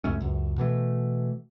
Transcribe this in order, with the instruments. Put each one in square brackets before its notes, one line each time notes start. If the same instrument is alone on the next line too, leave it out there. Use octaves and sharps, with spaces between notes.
[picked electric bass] C#2 F#2 A3 C#4
C#2 F#2
B2 E3 A3